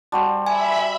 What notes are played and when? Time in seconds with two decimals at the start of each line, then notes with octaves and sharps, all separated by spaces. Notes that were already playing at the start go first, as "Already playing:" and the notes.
0.12 G3 F#4 C5 A5
0.47 E5 G#5 B5